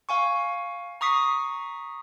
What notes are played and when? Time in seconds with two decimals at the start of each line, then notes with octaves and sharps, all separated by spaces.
0.09 F5 G#5 C#6
1.01 A#5 C#6 D#6 B6 C7